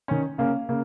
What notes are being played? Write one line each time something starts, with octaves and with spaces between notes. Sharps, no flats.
D#3 C#4
C#3 A#3 C#4 F5
C#3 A#3